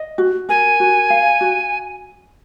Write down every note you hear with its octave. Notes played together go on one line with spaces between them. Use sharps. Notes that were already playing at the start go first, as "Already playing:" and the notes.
Already playing: D#5
F#4
A#4 G#5
F#4
F5
F#4